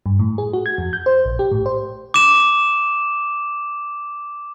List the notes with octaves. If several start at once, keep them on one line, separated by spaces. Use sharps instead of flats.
G2
A2
G#4
F#4
G#6
F2
G6
C5
A#1
G4
A2
C5
D6 E7